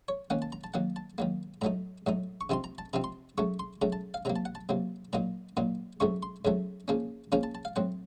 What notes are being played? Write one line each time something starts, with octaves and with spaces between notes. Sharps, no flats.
C#5
D#3 A#3 C#4 F#5
A5
A#5
A5
D#3 F#3 A#3 F#5
A5
D#3 F#3 A#3
A2 F#3 A3 D#4 A#5
A2 F#3 A3 D#4
C#6
C3 F3 C4 D#4 C6
A#5
A5
C3 F3 C4 D#4 A#5
C6
C#3 F#3 A3 C#6
C6
C#3 F#3 A3 A#5
A5
F5
C3 F#3 A#3 A#5
A5
F#5
A5
C3 F#3 A#3
A#2 F#3 A#3 D#4 A#5
A#2 F#3 A#3 D#4
F2 C#3 F#3 A3 C#6
C6
F2 C#3 F#3 A3
C#3 F3 A#3 C#4
C#3 F3 A#3 C#4 A#5
A5
A5
F5
A2 F#3 C4 F#5